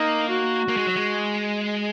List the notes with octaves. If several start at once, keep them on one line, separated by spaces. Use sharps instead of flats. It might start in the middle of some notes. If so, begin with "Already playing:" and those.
Already playing: A#3 D#4
F#4
A#3
G#3
F#3
G#3